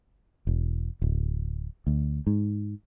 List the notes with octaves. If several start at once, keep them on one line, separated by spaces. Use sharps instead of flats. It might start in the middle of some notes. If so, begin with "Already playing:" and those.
E1
D1
D2
G#2